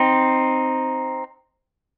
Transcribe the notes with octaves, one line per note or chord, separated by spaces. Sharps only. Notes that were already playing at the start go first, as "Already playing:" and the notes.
Already playing: C4 D#4